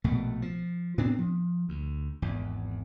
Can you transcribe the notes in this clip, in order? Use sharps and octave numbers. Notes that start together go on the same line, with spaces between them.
A#1 B2 A3
F3
A2 B3 C4 D4
F3
D2
G#1 E2